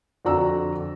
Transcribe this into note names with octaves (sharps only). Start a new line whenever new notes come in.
F2 D3 F#4 D5 A#5 E6